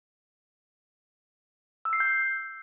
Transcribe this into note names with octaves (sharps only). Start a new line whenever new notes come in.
E6
C7
G6